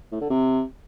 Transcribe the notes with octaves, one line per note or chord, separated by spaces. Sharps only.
A2
D3
C3